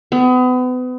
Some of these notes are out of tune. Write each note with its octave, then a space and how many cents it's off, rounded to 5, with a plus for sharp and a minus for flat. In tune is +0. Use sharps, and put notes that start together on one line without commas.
B3 +35